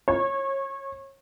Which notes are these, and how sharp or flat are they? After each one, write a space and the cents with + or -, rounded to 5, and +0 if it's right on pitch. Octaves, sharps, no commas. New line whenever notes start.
C#5 -25